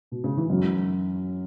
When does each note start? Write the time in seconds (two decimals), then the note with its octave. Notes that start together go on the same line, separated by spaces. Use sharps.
0.12 B2
0.24 C#3
0.37 E3
0.50 F#2 F#3